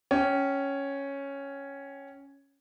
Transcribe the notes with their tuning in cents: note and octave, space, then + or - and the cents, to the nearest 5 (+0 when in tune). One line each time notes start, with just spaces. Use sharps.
C#4 +0 G5 -25